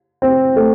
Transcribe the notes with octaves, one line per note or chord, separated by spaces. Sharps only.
C4
A3